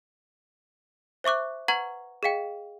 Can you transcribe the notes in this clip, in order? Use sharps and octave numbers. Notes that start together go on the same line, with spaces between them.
C5 E5 C#6 D6 F#6
B4 F#5 A#5 C#6 G#6 F#7
G#4 D#5 F5 G5